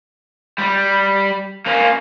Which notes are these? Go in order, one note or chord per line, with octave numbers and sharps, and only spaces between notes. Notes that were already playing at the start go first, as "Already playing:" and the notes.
G3
A#3 C#4